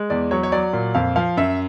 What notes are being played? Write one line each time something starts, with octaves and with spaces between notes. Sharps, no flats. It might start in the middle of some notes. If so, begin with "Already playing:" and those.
Already playing: G#3
E2 D5
F#3 C#5
C#5
F#3 D5
A#2
F2 F5
F3 F5
F#2 E5